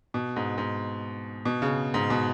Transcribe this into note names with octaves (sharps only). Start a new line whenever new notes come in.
B2
G#2
G#2
B2
C#3
G#2
B2